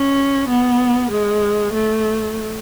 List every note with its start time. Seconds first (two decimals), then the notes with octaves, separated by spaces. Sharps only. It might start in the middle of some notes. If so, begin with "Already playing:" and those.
Already playing: C#4
0.49 B3
1.11 G#3
1.74 A3